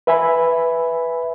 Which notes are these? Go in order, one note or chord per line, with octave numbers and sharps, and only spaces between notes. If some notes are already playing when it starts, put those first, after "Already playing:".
B4 E5 G#5 B5